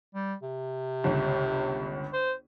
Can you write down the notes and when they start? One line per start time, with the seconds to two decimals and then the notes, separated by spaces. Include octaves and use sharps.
0.15 G3
0.42 C3
1.04 G1 C#2
2.13 C5